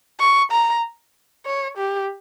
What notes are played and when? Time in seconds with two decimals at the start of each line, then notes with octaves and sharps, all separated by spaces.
0.20 C#6
0.52 A#5
1.45 C#5
1.78 G4